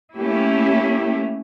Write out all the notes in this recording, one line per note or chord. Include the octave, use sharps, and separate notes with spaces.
A3 A#3 C#4 E4 G4